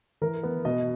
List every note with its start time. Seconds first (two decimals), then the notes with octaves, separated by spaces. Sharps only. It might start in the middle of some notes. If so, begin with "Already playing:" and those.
0.21 E3 A#4
0.43 B3
0.65 B2 D#5